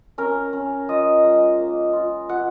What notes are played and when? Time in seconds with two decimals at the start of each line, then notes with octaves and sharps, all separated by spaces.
0.18 C#4 A#4
0.53 C#4
0.88 F4 D#5
1.24 G#3
1.59 A#3
1.93 F4
2.29 F4 F#5